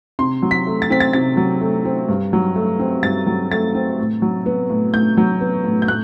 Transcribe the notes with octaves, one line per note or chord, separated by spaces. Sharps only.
C3 C6
F#3
B6
A3
A6
C4 B6
A6
C3 A6
F#3
A3
C4
G2
F#3
A3
C4
G2 A6
F#3
A3 A6
C4
A2
F#3
B3
A2
A2 G6
F#3
B3
A2
G6
A2 F#6